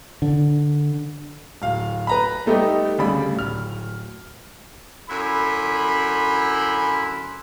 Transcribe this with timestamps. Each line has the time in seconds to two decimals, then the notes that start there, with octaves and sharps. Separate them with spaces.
0.22 D3
1.62 D1 F5
2.07 B4 A#5 B5
2.46 G3 A3 B3 D#4 G4
2.98 D2 C#3 G3 D5 B5
3.35 D1 F6
5.09 F#2 D3 E4 B5 C6